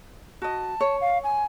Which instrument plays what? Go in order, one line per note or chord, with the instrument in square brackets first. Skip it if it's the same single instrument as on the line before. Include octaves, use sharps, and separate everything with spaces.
[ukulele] F#4 D#5 [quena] A5
[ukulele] C#5
[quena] F5
G#5